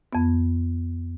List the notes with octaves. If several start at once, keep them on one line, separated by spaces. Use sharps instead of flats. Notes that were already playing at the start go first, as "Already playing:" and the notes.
F2 B3